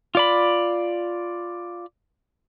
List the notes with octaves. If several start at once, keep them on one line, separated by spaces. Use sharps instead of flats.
F4 D5 B5